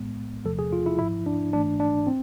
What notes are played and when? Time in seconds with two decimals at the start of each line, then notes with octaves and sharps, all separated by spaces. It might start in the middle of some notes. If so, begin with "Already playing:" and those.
Already playing: B1 A2 G#3 B3
0.45 E2 C3 F3 A3 A4
0.59 G#4
0.73 F4
0.86 E4
0.99 G#1 G#2 F3 E4
1.26 D4
1.53 G#1 G#2 E3 A3 D4
1.80 D4
2.07 C4